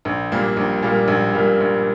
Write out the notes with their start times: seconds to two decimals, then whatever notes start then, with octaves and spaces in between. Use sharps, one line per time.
0.05 A#1
0.32 A#2 G3 A#3
0.57 A#1
0.83 A#2 G3 A#3
1.08 A#1
1.34 A#2 G3 A#3
1.60 A#1